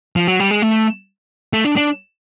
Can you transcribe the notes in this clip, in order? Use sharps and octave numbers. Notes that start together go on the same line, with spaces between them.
F3
F#3
G3
G#3
A3
A3
D4
D4